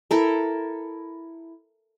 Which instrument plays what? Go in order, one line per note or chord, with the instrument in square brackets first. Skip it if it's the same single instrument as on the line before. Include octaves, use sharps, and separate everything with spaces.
[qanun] E4 A4 A#4